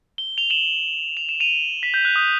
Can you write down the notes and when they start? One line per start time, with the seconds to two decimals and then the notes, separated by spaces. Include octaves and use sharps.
0.18 G7
0.38 F7 G7
0.50 E7 F#7
1.17 F7
1.29 E7
1.40 D#7 F7
1.83 B6
1.94 G6
2.05 F#6
2.16 D#6